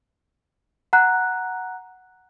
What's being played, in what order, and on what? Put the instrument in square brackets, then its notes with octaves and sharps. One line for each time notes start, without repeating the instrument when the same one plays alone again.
[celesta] F#5 A#5 F#6